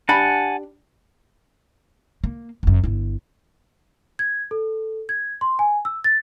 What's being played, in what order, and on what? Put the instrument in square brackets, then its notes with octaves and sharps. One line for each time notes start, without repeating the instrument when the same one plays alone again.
[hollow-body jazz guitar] D4 G4 B5 [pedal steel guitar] F#5 G#5 A5
[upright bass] A#3
F#1 F#2
G1 E4
[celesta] G#6
A4
G#6
C6
G#5
E6
A6